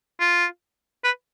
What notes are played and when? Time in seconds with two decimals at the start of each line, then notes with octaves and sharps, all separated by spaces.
0.20 F4
1.04 B4